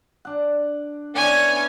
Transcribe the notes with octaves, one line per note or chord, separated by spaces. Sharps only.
D4 F#5
E3 B3 C#4 D4 G#5